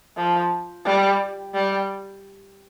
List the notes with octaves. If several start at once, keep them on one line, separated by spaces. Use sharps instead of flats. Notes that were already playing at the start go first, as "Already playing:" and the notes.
F3
G3
G3